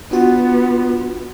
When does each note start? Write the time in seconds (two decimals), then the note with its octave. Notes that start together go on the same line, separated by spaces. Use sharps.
0.11 B3 D4 F4 F#4